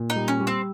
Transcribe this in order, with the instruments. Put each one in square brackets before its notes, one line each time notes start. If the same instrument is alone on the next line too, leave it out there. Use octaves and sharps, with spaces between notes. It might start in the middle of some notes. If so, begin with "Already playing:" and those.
Already playing: [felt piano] A#2
[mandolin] D#4
[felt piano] G3
[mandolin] C#4
[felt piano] G3
[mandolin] C4